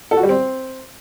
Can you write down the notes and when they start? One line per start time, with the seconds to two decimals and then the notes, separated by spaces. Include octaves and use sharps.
0.11 A4
0.17 F#4
0.23 G3
0.29 C4